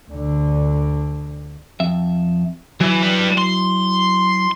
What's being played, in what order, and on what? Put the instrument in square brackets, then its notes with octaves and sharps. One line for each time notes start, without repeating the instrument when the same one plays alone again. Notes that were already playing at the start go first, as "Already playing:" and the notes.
[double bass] D2 D3
[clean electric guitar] F2 E5
[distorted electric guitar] E3 [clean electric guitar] F#3 E4
[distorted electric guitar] G3 B4
C6